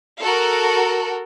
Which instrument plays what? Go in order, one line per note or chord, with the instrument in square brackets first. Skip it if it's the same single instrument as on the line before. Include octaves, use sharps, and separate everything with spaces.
[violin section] F#4 A4 A#4